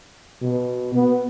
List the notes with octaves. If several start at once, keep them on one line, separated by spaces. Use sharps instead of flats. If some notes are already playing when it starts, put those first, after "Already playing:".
B2
B3